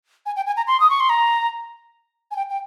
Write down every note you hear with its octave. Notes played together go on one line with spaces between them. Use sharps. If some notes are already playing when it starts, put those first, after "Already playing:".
G#5
G5
G#5
A#5
C6
D#6
C#6
C6
A#5
G#5
G5
G5